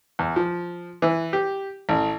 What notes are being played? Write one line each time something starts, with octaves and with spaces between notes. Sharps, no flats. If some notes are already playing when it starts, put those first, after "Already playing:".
E2
F3
E3
G4
A1